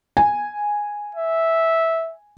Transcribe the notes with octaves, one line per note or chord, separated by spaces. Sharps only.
G#5
E5